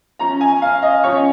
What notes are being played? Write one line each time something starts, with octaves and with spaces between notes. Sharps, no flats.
F3 C#4 A#5
G#5
F5
D#5
F3 C#4 C#5